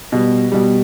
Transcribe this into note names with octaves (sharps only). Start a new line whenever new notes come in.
B2 G3
B2 G3